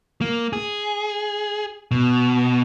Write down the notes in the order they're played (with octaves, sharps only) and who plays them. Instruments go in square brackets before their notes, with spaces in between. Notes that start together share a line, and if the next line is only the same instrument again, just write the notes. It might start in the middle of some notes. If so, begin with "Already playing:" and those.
[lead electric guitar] A#3
G#4
B2